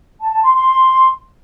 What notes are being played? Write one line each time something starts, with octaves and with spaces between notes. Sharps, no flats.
A5
A5
C6
C6